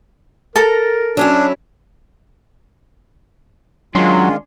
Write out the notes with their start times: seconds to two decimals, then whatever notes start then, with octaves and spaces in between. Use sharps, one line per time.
0.56 A4 A#4 A#5
1.17 F#3 C#4 D4 E4
3.95 D#3 F#3 G#3 C#4 D4 F4 C6